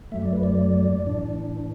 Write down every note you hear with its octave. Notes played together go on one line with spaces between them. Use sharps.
F#2 F#3 A3 E5
D5
B4
D5
A2 E3 D4